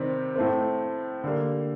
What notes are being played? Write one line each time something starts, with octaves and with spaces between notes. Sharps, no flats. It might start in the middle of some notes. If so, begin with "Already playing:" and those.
Already playing: C3 D#3 G3 C4
A2 A3 C4
D3 G3 A#3